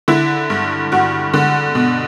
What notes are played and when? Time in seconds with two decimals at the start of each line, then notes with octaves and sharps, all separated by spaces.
0.08 D3 E4
0.50 G2
0.92 G2 F#4
1.34 D3
1.75 B2